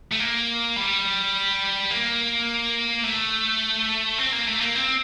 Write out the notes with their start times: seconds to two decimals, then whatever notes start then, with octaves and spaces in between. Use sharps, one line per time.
0.12 A3
0.19 A#3
0.77 G3
1.91 A#3
3.04 A3
4.18 C4
4.32 A#3
4.47 A3
4.61 A#3
4.75 C4